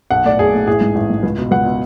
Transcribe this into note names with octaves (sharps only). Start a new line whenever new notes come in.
B1 F#5
A2 D5
B1 G#4
A2
A1 G#4
G#2
A1
G#2
C#2
B2
C#2 F#5
B2